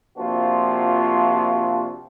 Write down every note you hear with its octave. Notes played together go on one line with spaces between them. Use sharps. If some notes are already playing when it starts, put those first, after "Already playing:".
C3 F3 A#3 D4 F4 F#4